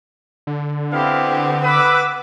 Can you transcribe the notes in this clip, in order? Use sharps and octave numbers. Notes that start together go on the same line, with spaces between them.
D3
B3 C4 E4 G4 F5
B4 D6 E6